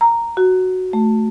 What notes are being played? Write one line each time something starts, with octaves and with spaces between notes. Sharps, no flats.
A#5
F#4
A3